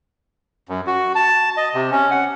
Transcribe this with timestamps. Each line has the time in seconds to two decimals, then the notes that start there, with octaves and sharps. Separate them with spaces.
0.69 F#2
0.87 F#4
1.15 A5
1.57 D#5
1.74 C3
1.92 C#4
2.11 F#5